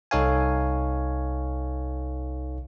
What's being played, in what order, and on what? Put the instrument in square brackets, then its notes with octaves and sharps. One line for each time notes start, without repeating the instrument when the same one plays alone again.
[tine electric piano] C2 D#4 A4 C#5 F5 G#5